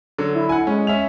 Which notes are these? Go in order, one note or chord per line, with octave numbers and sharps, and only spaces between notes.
D3 F#3
E4
F#5 G#5
G#3 C#4
C#4 E5 F7